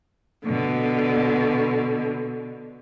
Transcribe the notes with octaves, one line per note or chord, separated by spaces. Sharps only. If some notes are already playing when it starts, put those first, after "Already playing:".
B2 D3